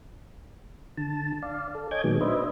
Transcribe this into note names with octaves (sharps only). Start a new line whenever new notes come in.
D3 A5
D5 F5
A4
C#5 D#5 G#5 D6 G6 G#6
A#2 D#3 F#3 G#3 B3
D4 B4 C5 D#5 E5